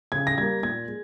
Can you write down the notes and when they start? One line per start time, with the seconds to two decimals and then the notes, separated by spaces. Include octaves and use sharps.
0.12 C#3 G#6
0.27 A#6
0.37 G3 A#3 G#6
0.63 A#2 G#6
0.88 G#3